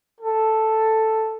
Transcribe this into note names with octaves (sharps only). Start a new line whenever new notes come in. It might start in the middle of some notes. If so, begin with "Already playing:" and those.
A4